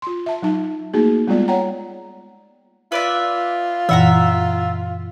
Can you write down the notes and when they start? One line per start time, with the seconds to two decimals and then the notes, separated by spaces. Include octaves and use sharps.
0.02 F4 C6
0.26 E5 A5
0.42 F#3 D#4 A5
0.94 A3 A#3 D#4 F#4 G#4
1.27 G3 G#3 B3 F4 D5
1.48 C#5 F#5 G5 A#5
2.92 F4 B4 D5 E5
3.89 F#2 A#2 E3 E5 F#5 A#5